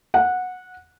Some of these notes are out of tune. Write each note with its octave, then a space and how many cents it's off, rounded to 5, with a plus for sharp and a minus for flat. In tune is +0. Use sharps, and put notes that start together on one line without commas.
F#5 -15